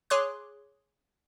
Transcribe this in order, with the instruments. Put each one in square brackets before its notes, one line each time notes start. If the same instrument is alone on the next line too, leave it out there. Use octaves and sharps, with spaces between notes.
[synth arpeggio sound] G#4 C#5 C6 D6 F#6